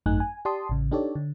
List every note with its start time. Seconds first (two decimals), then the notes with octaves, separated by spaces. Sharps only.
0.06 G#1 F#2 A3 D#4 G#5 F#6
0.20 G#5
0.45 G4 D5 A5 C6 D#6
0.69 A1 C#3
0.92 D4 D#4 G4 A4 C#5 D5
1.15 D3